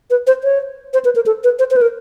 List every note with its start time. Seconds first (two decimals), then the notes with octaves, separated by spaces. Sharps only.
0.10 B4
0.27 C5
0.44 C#5
0.93 C5
1.05 B4
1.15 A#4
1.26 A4
1.44 B4
1.59 C5
1.71 C5
1.76 B4
1.81 A#4